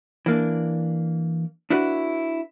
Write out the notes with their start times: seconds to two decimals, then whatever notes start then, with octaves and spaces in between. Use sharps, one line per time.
0.26 E3 A#3 D4
1.70 D4 E4 F#4 B4